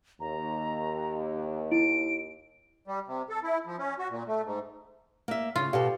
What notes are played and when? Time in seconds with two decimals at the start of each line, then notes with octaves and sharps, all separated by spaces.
0.20 D#2 A#5
1.72 E4 D7
2.87 G3
3.07 C3
3.29 A4
3.43 E4
3.66 F3
3.79 C#4
3.99 F#4
4.10 A#2
4.28 A3
4.45 G#2
5.28 A#3 E5
5.56 C#3 F4
5.73 B2 G4 A4 D5 F5